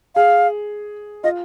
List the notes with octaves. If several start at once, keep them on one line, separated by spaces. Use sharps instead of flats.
G#4 F5
F4 D#5